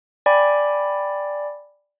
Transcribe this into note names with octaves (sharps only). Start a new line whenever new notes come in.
D5 G5 G#5 B5